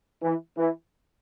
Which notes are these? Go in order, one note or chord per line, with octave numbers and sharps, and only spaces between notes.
E3
E3